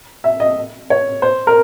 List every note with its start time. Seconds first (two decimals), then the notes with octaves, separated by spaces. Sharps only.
0.24 E5
0.40 D#5
0.90 C#5
1.22 C5
1.47 A#4